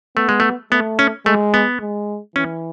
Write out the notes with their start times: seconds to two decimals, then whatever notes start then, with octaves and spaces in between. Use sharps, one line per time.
0.16 A3 B3
0.29 G#3
0.40 A3
0.72 A3 B3
0.99 C#4
1.26 G#3 A3
1.54 B3
1.81 G#3
2.36 E3 C#4